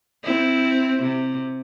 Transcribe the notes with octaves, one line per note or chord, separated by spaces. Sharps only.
C4 E4
C3